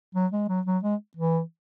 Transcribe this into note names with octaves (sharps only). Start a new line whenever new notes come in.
F#3
G#3
F#3
F#3
G#3
E3